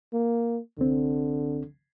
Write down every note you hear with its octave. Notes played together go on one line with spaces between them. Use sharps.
A#3
C2 D3 C4